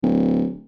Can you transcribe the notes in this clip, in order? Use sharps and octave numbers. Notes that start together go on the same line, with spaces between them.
D1